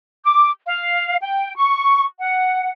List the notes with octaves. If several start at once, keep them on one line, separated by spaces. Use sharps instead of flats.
D6
F5
G5
C#6
F#5